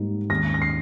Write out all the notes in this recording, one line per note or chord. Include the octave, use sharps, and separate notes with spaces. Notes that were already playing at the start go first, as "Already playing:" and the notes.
Already playing: G#2 G3 A#3 D#4
D#2 D#3 G#3 C#4 A#6
A#6
C7